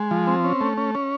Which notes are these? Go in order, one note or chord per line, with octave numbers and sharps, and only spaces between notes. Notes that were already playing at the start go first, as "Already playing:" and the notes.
Already playing: G#3
F3
C4
C#4
A3
C#4
C#4